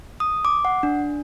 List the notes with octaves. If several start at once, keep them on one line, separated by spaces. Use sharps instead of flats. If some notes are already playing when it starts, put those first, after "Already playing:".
D#6
D6
F#5
D4